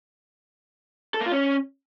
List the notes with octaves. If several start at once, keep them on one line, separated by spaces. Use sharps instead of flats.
A4
A#3
F4
C#4